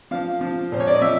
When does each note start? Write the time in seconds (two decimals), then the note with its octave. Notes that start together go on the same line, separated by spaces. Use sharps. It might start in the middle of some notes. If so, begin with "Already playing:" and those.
0.11 F3 F5
0.41 F3
0.72 A#2 C5
0.80 C#5
0.87 D5
0.94 D#5
1.01 F3 E5